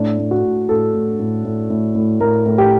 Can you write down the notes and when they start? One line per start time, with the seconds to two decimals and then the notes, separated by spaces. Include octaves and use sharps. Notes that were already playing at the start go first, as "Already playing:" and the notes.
Already playing: A2 D4
0.19 A2
0.31 F#4
0.43 A2
0.69 A2 A4
0.94 A2
1.19 A2
1.45 A2
1.70 A2
1.95 A2
2.20 A2 A#4
2.46 A2
2.58 G4